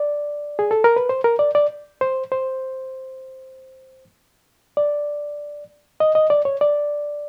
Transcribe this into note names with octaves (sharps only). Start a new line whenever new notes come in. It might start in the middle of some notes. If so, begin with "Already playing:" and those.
Already playing: D5
G#4
A4
A#4
B4
C5
A#4
D5
D5
C5
C5
D5
D#5
D#5
D5
C#5
D5